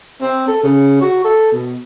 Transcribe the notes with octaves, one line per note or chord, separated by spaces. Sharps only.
C4
A4
C#3
F#4
A4
B2